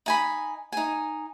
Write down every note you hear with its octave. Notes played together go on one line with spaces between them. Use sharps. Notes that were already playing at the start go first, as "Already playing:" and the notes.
D#4 G#5 B5
D#4 G#5